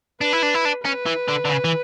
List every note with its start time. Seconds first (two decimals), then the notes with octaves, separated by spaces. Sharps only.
0.21 D4 B4
0.33 E4
0.43 D4
0.55 E4
0.65 D4
0.85 C#4 B4
1.06 E3
1.28 D3
1.45 D3
1.50 C#3
1.65 E3